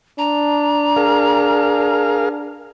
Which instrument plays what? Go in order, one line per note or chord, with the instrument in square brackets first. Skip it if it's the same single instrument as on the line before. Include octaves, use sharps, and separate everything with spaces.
[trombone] D4 [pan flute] A#5
[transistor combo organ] G#4 A#4 F5